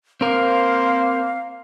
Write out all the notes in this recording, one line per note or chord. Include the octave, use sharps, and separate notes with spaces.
A#3 C4 A#4 C5 F5